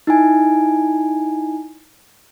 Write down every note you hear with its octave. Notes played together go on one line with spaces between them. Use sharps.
D#4 E4 G#5